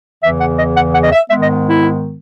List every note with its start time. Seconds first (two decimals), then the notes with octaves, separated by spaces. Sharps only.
0.24 E2 C#3 E3 B3 E5
0.41 F#5
0.59 D#5
0.77 F#5
0.95 F#5
1.04 D#5
1.12 E5
1.30 G#2 D#3 G#3 B3 E5
1.43 D#5
1.70 E4